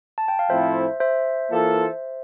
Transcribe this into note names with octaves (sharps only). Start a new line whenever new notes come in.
A5
G5
F5
A2 F3 C4 E4 A4 C5 E5
C5 E5
E3 A#3 F4 A4